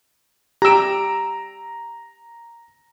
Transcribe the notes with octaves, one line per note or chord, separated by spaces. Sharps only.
G4 A#5 E6 D7